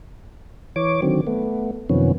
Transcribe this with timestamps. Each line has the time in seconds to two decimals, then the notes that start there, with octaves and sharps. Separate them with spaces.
0.76 E3 C#5 D6
1.02 D3 D#3 F#3 C4
1.27 A3 B3
1.90 F#2 C3 D#3 F3 B3 C#4